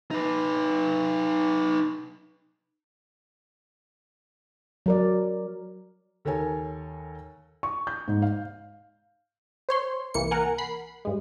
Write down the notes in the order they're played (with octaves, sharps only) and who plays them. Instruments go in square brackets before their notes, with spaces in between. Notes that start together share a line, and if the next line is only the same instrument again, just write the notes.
[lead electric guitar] D#4 B4
[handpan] F#3 A#4 D5
[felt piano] D#2 A4 A#4 C#5 G#5
C#6
G6
G#2
F5
[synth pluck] C5 C#5 C6
C2 E3 A#3 C#7
A#4 F#5 G#5
B5 C7
G2 G#3